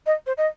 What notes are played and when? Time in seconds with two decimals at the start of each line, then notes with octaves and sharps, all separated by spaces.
0.06 D#5
0.27 C5
0.38 D#5